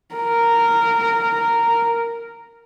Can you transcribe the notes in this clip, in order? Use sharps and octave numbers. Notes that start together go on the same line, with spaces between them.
A#4